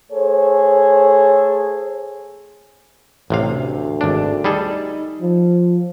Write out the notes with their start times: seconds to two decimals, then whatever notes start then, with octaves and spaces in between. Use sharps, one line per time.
0.11 A3 G#4 A4 C5 C#5
3.30 A1 D2 C3 F5
4.01 G#1 D4
4.44 G3 D#4 G#4 A4
5.21 F3